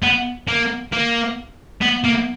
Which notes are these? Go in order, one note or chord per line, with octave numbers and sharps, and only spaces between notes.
B3
A#3
A#3
B3
A#3